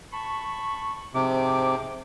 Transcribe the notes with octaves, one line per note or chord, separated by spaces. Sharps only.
A5 B5 C#6
G#2 C3 F3 D6